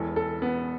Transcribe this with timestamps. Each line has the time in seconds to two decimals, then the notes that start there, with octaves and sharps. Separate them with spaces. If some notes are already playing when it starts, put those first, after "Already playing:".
Already playing: E1 E2 E3 A4
0.16 A4
0.42 B3